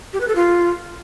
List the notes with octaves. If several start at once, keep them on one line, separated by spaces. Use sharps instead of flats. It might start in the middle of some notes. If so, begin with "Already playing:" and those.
G4
B4
A4
F4